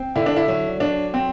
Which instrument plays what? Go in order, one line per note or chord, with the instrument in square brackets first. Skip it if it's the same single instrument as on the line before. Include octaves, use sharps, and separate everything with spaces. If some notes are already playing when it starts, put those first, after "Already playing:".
Already playing: [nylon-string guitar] C4
[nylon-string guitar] D3 [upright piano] E4
[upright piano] D4
E4
[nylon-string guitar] F#3
[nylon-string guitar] F#3 [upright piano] D4
[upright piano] C4